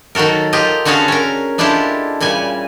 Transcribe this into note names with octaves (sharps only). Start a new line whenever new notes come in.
D#3 F#3 F#4 A4 A#4
F4 G4 D#5
D3 C#4 F#4 G#4 A4 F5
C#4 A#4
G#3 D4 E4 F4 G4 A4
A#2 C#3 G3 G#5